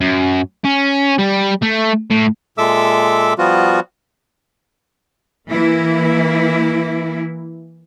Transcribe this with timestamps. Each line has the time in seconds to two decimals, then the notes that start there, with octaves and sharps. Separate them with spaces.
0.01 F#2
0.65 C#4
1.19 G3
1.62 A3
2.10 A2
2.58 A#2 G#3 A4 E5 D6 E6
3.38 F3 G3 B3 F4 F#4
5.50 E3 A#3 E4